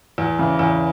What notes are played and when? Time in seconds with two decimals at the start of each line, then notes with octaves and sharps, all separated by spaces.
0.18 E2
0.39 C#3 E3
0.59 E2